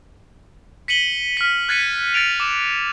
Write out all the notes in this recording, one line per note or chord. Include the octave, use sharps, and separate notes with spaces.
B6 C#7 D#7 F#7 G7
F6 B6
F#6 G#6 A6 B6 C#7 D#7
A6 C#7 D7 F7
D6 E7